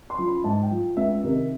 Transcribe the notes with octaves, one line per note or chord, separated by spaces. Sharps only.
C6
C#3 F3
B5
G#2 A5
G5
F3
C#2 E5
C3 D#3